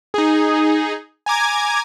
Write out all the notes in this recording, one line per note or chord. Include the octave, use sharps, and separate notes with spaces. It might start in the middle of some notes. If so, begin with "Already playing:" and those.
D#4 G#4
G#5 A#5 D6 G#6